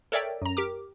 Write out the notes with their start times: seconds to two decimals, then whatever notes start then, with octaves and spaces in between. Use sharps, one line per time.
0.12 A4 A#4 C#5 D5 E5 G5
0.42 F#2 A#5
0.57 G4 A#4 D6